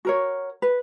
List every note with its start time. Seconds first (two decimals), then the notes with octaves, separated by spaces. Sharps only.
0.05 F#4 A#4 C#5
0.62 B4